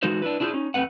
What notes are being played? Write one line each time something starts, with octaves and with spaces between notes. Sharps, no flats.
E3 G#3 D#4 F#4 A4 C5
D4 E4 B4
D4 E4 F4 G#4 C5
C#4 D#4
E2 A3 C4 B4 F#5